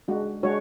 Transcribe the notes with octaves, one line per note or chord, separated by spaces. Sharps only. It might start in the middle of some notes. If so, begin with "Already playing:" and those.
G#3 D4 F#4
G#3 D4 F#4 C#5